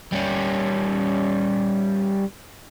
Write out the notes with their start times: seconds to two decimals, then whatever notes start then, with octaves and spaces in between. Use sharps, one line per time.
0.12 G3 C#4